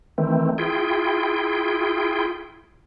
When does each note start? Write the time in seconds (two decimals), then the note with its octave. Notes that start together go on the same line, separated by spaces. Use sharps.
0.18 D#3 E3 A3 C4
0.58 E4 F4 G#4 G5